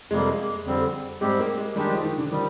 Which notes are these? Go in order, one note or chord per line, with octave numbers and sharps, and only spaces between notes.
F2 C3 G3 G#3 A#3
F2 D3 G3 C4
G#2 G3 G#3 C4 G4
A#3
G#3
D#3 G3 G#3 D4 G4
F3
D#3
D3
D#3 F3 G3